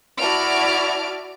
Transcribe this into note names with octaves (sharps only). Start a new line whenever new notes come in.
E4 F#4 D5 A5 F6 D7